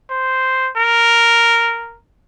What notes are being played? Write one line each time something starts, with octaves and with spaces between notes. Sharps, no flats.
C5
A#4